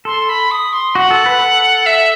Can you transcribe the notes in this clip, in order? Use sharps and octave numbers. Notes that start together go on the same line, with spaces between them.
A4 C6
B5
D#6
C6
F#4 F#5
A4
B4
A4
E5